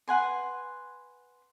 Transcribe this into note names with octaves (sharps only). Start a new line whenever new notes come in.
B4 F#5 G#5 C6